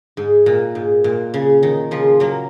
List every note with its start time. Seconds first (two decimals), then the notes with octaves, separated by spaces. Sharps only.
0.17 G#2
0.46 A#2
0.75 G#2
1.04 A#2
1.34 C#3
1.63 D#3
1.91 C#3 F3
2.20 F#3 A#3